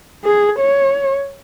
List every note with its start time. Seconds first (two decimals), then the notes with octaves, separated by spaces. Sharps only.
0.24 G#4
0.59 C#5